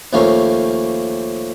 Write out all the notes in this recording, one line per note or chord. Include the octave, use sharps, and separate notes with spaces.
D#2 F3 A3 C#4 A#4